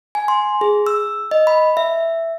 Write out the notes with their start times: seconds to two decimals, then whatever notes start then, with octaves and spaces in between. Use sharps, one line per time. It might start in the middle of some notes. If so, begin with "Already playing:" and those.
0.15 G#5
0.28 C6
0.61 G#4
0.87 E6
1.31 D#5
1.47 B5
1.77 E5